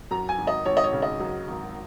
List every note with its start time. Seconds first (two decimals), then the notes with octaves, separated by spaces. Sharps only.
0.11 F#2 A#5
0.29 G#5
0.38 G#1
0.47 D#5
0.66 G#1 C#5
0.77 D#5
0.84 C#5
0.93 C#3
1.02 D#5
1.20 F#2
1.48 G#1